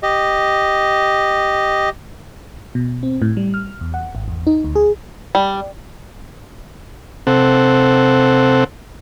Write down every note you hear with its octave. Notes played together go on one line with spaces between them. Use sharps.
G4 D#5
B2
C4
A2
G3
F6
E2
F#5
G#1
E2
D#4
D2
G#4
G3
C3 C4 A4 F#5